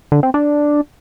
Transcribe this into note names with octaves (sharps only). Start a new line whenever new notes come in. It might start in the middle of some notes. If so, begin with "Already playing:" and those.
D3
C4
D4